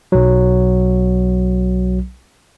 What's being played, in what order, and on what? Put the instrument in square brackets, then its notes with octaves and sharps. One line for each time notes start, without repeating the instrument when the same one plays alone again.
[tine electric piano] B1 F#3